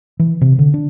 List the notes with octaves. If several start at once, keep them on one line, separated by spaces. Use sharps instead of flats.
E3
C3
D3
D4